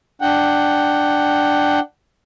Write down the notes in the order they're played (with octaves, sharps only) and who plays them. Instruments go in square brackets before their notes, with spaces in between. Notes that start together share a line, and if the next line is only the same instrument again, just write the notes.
[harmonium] D4 F#5 G5